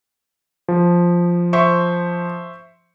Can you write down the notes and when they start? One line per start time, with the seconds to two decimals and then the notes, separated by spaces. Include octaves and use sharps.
0.68 F3
1.53 C5 E5 C#6